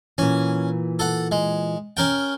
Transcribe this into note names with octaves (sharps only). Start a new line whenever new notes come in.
A#2 E3 C#4
A4 F#5
G#3
C#4 A#4 G5